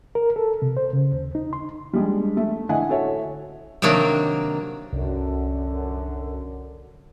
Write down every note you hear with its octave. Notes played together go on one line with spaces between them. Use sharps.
A#4
A4
C3
C5
C#3
D#2
D#4
C6
G3 G#3 D4
A3
A2 D3 D#5 E5 F#5 G#5
E4 F#4 A4 C#5 E5
C3 D#3 F#3 A#3 D4
C2 F#2 D3